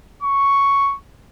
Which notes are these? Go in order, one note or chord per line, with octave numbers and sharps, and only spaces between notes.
C#6